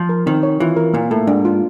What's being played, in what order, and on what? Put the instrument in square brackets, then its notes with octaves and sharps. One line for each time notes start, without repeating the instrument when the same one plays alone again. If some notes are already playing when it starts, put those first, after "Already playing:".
Already playing: [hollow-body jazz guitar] F3
[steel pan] A#4
[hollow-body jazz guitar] D#3 [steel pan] C4
[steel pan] C#5
[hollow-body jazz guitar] E3 [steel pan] F4
[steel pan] A#4
[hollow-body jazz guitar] A#2 [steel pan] A#3
[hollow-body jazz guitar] A2 [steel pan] A4
[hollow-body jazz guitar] G#2 [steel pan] D4
[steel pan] F4